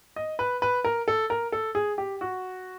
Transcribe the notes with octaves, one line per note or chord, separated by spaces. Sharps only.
D#5
B4
B4
A#4
A4
A#4
A4
G#4
G4
F#4